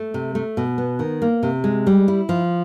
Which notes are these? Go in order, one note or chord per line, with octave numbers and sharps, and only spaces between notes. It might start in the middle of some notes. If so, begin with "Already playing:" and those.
Already playing: A3
C3
A3
B2
B3
D#3
A#3
C3
G#3
G3
E4
F3